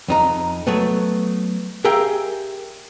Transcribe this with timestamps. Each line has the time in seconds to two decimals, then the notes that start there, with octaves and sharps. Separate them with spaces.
0.08 F2 D#4 A#5
0.67 F#3 A3 B3
1.85 G4 G#4 A#4 E5 F5 G5